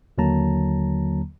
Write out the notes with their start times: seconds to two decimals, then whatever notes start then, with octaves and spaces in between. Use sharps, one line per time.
0.18 D#2 D3 F#3 A#3 A5 A#5